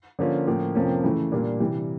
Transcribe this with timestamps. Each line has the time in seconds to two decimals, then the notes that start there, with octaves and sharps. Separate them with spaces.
0.19 D3 F3 A#3 C#4 F4
0.47 A2 F3 A#3 C#4
0.75 F2 C3 F3 A#3 C#4
1.04 C#3 E3 A3
1.32 A#2 G3 A#3 D4
1.60 C3 E3 G3